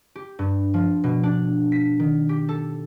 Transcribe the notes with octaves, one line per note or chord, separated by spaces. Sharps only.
G4
G2
F3
B2
D4
B6
D#3
G4
A4